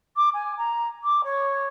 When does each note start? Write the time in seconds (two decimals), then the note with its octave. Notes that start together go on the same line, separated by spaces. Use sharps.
0.16 D6
0.34 G#5
0.58 A#5
1.03 D6
1.24 C#5